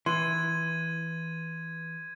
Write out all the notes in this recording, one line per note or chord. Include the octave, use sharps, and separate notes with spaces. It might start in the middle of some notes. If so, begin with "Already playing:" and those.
E3 C6 G#6 D#7